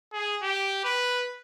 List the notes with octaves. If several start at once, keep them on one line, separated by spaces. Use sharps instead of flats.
G#4
G4
B4